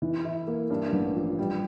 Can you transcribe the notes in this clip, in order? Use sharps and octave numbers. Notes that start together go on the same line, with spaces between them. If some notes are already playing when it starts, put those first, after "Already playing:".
E3
E4
A#3
G2
A1
F3
G3